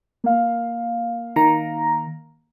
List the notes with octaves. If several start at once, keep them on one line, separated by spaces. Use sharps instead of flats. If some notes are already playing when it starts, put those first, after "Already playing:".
A#3 F5
D#3 A#5